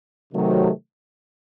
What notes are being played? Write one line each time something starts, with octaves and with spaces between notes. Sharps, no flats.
C3 D#3 F#3 A3